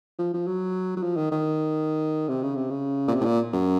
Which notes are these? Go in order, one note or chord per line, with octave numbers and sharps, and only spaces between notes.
F3
F3
F#3
F#3
F3
D#3
D#3
C3
C#3
C3
C#3
A#2
C3
A2
A#2
F#2